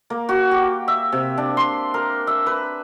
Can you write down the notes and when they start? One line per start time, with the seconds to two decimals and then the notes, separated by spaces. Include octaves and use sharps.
0.10 A#3
0.29 F#4
0.51 G4
0.88 E5
1.12 C3
1.37 D4
1.57 C6
1.94 A#4
2.27 E5
2.46 B4